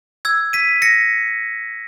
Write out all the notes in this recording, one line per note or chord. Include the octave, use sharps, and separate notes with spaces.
E6 G#6
B6 D#7
A#6 C#7